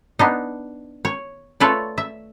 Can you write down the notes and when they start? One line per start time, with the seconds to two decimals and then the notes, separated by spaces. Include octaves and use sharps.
0.19 B3 D4 D#4
1.05 C#5
1.60 A3 F4 A4 B4 C#5 D5
1.98 E5